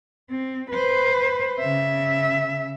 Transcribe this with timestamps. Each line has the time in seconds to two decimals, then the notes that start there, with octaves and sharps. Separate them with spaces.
0.31 C4
0.71 B4 C5
1.60 C#3 E5